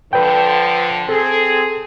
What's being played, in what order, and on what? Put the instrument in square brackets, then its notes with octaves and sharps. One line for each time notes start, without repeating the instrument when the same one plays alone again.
[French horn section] D3 F3 [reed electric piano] B4 G5
[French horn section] C4 G#4 [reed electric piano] A4